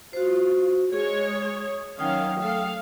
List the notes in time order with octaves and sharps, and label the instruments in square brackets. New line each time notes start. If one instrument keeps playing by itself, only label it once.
[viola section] F4 [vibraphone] F#4 C5
[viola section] G#3 C#5 [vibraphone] G#4
[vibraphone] D#6
[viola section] D#3 C#4 F5 [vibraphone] F#3 G5 D#6
[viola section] A3 A4 F5